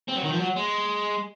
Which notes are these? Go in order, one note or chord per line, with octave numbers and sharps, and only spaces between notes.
C4
F#3
D#3
F3
F#3
G#3